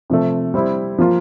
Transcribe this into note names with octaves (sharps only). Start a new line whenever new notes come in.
C3 F3 A3
G3 C4 E4
F3 A#3 F4